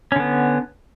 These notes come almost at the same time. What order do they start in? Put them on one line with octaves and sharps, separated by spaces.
C#4 D3 B3